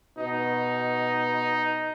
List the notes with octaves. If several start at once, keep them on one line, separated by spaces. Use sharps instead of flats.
B2 D#4